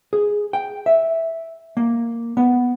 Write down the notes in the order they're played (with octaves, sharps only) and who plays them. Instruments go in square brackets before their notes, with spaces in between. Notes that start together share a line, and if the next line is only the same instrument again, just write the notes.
[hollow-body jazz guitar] G#4
G5
E5
A#3
B3